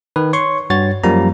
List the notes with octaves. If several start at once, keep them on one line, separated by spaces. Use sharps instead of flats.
D#3 B4
C#5 C6 C#6
G2 F#4 C#5 A6
F#2 F3 G3 A#3 A#5